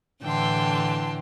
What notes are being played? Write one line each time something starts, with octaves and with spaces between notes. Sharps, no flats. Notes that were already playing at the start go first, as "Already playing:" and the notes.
A2 D3 E3 G5 A5 C6